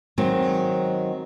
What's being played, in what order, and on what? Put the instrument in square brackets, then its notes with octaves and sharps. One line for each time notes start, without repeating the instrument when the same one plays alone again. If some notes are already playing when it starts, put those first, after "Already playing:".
[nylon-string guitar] D#3 F#3 G#3 C4